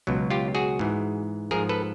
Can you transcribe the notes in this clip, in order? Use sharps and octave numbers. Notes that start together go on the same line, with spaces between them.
C#2 B2 F#3
F4 G4
F#4 G#4
G#2 E3
G#2 F3 G#4 A#4
A4 B4